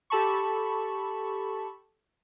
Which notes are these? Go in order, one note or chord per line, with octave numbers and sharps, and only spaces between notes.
G4 A4 A5 B5 C#6